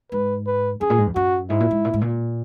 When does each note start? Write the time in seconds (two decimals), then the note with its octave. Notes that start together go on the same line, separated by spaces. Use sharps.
0.12 G#2 B4
0.46 B4
0.81 F#2 G#4
0.90 A#2
0.98 G#2
1.06 E2
1.15 F#2 F#4
1.50 G#2 E4
1.60 A#2
1.71 G#2
1.85 A#2
1.94 G#2
2.01 A#2